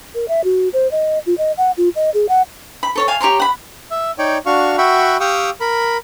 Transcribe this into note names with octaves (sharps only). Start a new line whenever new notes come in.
A#4
E5
F#4
C5
D#5
F4
D#5
F#5
F4
D#5
G#4
F#5
B5
A4 C#5 A5
F5 G#5 A5
G4 C#5 A#5 C6
F#5 B5
E5
D#4 C#5 D5 G5
D4 F#4 F5 C#6
F#4 E5 F#5 G5 B5 C#6
G4 F5 G5 C#6 D#6 E6
A#4 B5